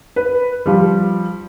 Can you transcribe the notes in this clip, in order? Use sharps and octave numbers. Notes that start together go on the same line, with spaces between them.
B4
F3 G3